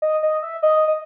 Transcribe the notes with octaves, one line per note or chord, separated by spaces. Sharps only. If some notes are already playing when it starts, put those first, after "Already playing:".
D#5
D#5
E5
D#5
D#5